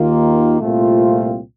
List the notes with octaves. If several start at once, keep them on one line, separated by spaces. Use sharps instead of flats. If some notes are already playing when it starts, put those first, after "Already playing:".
Already playing: D#2 D#3 A#3 F4
C2 A#2 A3 C4 F4